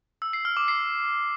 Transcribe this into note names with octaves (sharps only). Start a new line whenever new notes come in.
E6
C7
F6
D6
C7